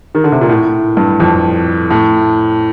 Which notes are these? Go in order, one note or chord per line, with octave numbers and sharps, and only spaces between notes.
D#3
D3
C3
A#2
A2
G2
F2
A2